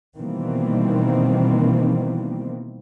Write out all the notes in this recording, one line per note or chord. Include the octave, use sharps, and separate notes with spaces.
B2 D#3 E3 G3 A#3 C4